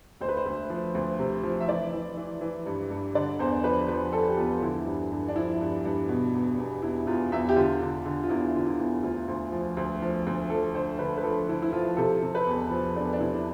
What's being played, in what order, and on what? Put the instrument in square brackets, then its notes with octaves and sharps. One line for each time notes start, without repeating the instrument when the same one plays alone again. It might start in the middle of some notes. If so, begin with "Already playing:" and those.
[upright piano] D2 C5
B4
C5
D2
F3
D2
C3
F3
E5
E3 D5
E3
E3
E3
G2
G2
D3 D5
E2 C5
F3 B4
F3 B4
F3 A4
G4
E2 F4
D3 E4
G2
G2
D4
F3 E4
G2
G2
B2
E2
E2
E2 E4
E2 F4
E2 E5
G4
D3 F4
D3
D3
F4
E2 E4
D3 F4
E4
E2
D2 F4
D2
F3
D2
F3
D2
F3 A4
D3 C5
D3 B4
B4
F3 A4
D3 E4
E4
F3 F4
C3 A4
C3
B4
E2
F3
E2 D4
D4
C3 E4
D4